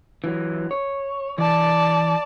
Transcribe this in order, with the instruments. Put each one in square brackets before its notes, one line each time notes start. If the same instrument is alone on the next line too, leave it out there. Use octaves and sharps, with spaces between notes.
[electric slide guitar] E3 F#3
C#5
[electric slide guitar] E3 [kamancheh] D5 A5